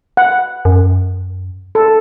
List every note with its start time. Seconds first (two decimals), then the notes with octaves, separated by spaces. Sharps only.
0.17 F#5
0.65 F#2
1.75 A4